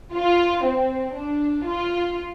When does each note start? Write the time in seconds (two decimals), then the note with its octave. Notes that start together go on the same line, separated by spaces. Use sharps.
0.15 F4
0.65 C4
1.16 D4
1.66 F4